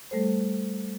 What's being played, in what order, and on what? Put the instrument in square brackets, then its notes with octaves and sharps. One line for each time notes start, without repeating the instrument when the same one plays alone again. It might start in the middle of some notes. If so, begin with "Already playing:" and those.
[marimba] G3 A3 A4 C5